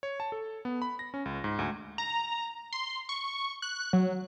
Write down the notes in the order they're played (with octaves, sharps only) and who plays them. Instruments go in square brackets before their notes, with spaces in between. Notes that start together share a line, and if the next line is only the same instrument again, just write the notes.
[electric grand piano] C#5
A5
A4
B3
B5
A#6
C#4
C#2
G#2
D2
[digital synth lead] A#5
C6
C#6
F#6
F#3